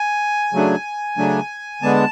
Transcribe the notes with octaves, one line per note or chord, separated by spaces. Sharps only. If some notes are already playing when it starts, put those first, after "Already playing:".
Already playing: G#5
C#3 F#3 A3 D4
C#3 F#3 A3 D4
D3 G#3 B3 D4 A5